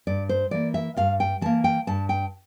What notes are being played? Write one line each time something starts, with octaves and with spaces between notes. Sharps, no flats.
G2 D5
C5
E3 A#3 D5
E5
G2 F5
G5
E3 A#3 A5
G5
G2 A5
G5